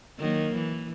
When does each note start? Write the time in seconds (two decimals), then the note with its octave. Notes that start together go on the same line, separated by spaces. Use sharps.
0.19 D#3 F#3 A#3
0.55 E3